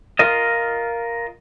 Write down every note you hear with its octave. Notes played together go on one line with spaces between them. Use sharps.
F4 A#4 D#5